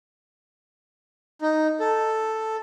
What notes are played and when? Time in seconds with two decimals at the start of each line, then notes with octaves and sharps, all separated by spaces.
1.42 D#4
1.80 A4